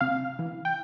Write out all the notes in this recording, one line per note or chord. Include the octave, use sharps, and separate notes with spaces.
C3 F5
E3
G5